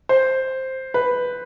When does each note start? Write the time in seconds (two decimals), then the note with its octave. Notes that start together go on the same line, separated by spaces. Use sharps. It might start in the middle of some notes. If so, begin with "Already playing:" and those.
0.09 C5
0.94 B4